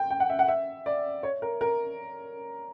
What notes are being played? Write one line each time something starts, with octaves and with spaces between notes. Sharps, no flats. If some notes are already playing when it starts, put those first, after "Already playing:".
Already playing: G5
G5
F#5
E5
F#5
E5
D5
C#5
A#4
A#4